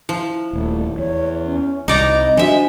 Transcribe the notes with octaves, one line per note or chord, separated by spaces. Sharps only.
F3 E4
D#1 A3
E2 C#5
C#4
C2 D#4 D5 D#5 A#5
F3 G#3 D4 F#4 E5